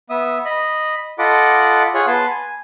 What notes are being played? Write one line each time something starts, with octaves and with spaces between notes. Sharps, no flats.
B3 E5 D#6
D#5 B5
F4 A4 D#5 F#5 B5 D6
F4 G#4 C#5 F#5
B3 B4 A5 C6
G#5